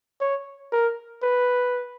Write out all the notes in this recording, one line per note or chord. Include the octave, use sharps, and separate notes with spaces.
C#5
A#4
B4